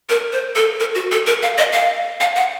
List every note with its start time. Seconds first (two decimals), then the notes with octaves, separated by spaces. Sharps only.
0.10 A#4
0.32 C5
0.56 A4
0.80 A#4
0.95 F#4
1.11 A4
1.27 A#4
1.43 F5
1.58 D#5
1.73 F5
2.20 F5
2.36 F#5